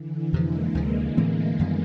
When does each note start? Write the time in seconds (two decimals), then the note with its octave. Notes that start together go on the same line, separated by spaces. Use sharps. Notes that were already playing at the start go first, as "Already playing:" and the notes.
Already playing: D3 E3
0.33 F2 C3 F3 G#3 A#3
0.75 D2 C3 F3
1.17 A2 E3 A3 C4
1.59 F#2 D#3 G3 B3